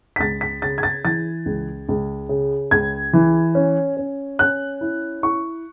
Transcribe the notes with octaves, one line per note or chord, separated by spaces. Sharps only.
B6
C#2 A6
B6
C#3 A6
G#6
A6
E3 A6
C#2
C#2
C#3
C#2 G#6
E3
C#4
C#4
C#4 F#6
E4
E4 C#6